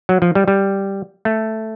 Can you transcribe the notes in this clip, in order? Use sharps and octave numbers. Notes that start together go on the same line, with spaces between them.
F#3
F3
G3
G3
A3